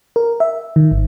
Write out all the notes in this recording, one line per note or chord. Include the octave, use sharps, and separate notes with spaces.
A#4
E5
D#3
G#1